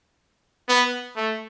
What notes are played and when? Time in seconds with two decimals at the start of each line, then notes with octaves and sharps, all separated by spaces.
0.69 B3
1.16 A3